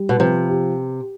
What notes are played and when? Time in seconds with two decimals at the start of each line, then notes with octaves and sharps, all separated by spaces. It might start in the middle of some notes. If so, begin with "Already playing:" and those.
Already playing: G3
0.09 B2
0.19 C3 F3
0.49 G4